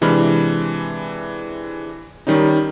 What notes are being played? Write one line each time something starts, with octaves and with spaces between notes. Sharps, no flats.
C3 E3 G#3 D4 B5 F6
D#3 G3 C#4 D#4